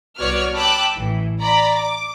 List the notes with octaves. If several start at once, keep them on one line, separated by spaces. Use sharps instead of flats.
C2 B3 F#4 C#5 D5 F6
G5 A5 B5 D6 E6 F#6
A1 E3
D5 A#5 B5
D6